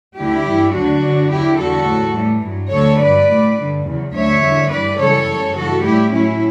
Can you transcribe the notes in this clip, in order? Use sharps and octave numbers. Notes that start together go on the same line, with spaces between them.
D2 D3 G3 E4 G4
G2 E3 G3
D2 D3 F#3 D4 F#4
F#2 D3 F#3
E2 D3 F#3 E4 G4
E2 D3 G3 F#4 A4
A2 F#3
A2 E3 G3
G2 F#3
D2 D3 F#3 A4 C#5
G2 F#3 B4 D5
A2 G3
G2 D3 G3
E2 C#3 F#3
D2 D3 F#3 C#5 E5
E2 D3 G3
G2 E3 G3 B4 D5
F#2 C#3 E3 G3 A4 C#5
F#2 C#3 G3
G2 E3 G3 F#4 A4
A2 G3 E4 G4
A2 F#3 C#4 E4